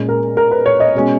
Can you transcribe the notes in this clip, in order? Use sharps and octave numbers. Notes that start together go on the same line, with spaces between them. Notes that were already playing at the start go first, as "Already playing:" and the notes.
Already playing: A#2 G#3 C#4
A#4
A#4
B4
C#5
D#5
B2 G#3 C#4